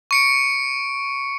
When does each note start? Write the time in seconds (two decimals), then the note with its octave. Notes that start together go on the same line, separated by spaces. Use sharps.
0.11 C#6 C#7 D7